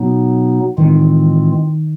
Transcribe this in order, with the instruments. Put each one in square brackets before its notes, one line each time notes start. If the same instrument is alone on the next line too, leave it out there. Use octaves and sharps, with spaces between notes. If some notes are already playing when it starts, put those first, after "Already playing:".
Already playing: [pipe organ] B2 F#3 B3 D#4
[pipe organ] A2 E3 G#3 C4 F4 [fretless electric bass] D#3